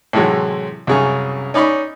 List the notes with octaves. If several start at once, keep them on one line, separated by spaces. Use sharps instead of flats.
A2 C3 E3 F#3 G#3
C2 F#2 C#3 G#4 C#6
C#4 D#4 D5 B5 C#6